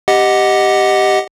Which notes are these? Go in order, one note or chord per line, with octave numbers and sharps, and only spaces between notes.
G4 D#5 F#5